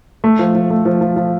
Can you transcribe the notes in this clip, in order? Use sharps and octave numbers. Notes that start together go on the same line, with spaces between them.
A3
F3
F3
A3
F3
F3
F3